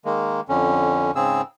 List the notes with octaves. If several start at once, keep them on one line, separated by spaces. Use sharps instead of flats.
D#3 G#3 A#3
F2 D3 C#4
G#2 C#3 C4 G#4 E6